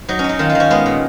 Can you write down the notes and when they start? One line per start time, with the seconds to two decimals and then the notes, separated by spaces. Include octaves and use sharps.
0.09 F#3 D#4
0.19 C#4
0.24 F#3 D#4
0.39 D#3 F4
0.50 F4
0.55 D#3
0.60 C#4
0.70 G#3 B3
0.86 A#2